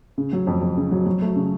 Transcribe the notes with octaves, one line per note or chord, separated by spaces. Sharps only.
C#3
F#3
F2
F2
C#3
F#3
F#3
A3
C#3